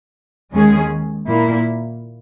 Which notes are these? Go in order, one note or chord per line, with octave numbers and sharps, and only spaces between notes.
D#2 D#3 G#3 C#4 G#4
A#2 A#3 E4